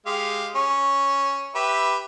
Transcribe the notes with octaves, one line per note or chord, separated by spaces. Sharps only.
G#3 G4 F5
C#4
G4 B4 E5